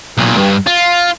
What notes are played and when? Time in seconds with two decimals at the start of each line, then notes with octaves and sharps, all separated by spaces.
0.18 B1 A#2
0.37 G2
0.67 F4